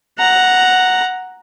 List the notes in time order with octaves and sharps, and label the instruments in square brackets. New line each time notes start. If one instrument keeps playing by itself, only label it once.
[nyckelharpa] F#5 A#5